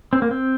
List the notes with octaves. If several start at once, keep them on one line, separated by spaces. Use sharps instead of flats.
C4
A#3
C4